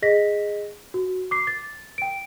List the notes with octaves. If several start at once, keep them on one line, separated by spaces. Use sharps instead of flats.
G#4 D#5 A#6 B6
F#4
D6 C7
A6
G5 D7